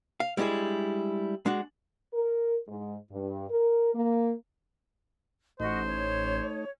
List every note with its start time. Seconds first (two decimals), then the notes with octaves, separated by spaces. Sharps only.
0.20 F5
0.37 G3 G#3 D4 E4 G#4
1.46 G#3 D4 F#4
2.13 A#4
2.68 G#2
3.11 G2
3.50 A#4
3.94 A#3
5.60 A1 A3 D#4 F#4 C5 D#5
5.86 C#5